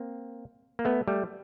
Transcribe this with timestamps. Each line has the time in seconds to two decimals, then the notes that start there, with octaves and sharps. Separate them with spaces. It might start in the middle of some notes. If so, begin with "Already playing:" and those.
Already playing: A#3 C4
0.79 A#3
0.85 A3 B3
1.08 G3 A3